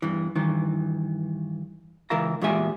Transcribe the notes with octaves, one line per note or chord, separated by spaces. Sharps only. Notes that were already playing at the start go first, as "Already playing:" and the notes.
E2 G2 E3
G2 D#3 E3
C#2 E3 A#4 E5 F5 A#5
E2 A#2 G#3 G4 E5 G#5